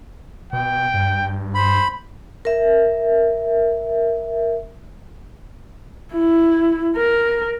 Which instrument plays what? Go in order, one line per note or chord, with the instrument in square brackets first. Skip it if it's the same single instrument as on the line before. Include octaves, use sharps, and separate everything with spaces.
[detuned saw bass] B2 [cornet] G5
[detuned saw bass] G2
[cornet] C5 [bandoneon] B5
[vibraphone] A#4 E5
[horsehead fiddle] E4
A#4